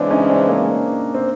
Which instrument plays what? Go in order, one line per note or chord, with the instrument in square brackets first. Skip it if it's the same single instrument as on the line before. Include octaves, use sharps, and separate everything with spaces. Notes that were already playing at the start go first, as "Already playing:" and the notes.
Already playing: [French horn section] C#3 E3 G#3 [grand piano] C4 D4
[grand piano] C#4 D#4
C4 D4
A#3 C4
C4